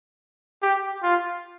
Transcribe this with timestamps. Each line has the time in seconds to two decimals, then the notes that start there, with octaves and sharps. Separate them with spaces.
0.62 G4
1.03 F4